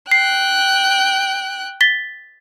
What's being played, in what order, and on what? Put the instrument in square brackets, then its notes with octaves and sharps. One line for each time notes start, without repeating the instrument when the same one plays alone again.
[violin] G5 F#6 [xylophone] C7
[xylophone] A6 B6 G7